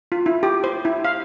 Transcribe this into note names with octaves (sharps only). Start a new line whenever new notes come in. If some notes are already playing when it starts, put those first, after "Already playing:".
F4
E4
G4
C5
E4
F5